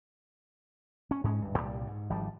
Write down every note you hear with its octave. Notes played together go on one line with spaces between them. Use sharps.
C#4
G#2 G#3 C#4
D1 G2
C2 A#2 G3
G#2
G#1 F3 G3